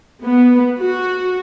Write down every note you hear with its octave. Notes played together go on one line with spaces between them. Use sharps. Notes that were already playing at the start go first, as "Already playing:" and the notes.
B3
F#4